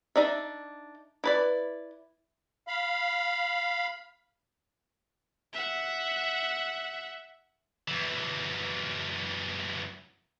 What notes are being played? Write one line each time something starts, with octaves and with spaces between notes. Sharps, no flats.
D4 D#4 D5 E5
E4 B4 D5
F5 B5
E5 F#5
F#2 E3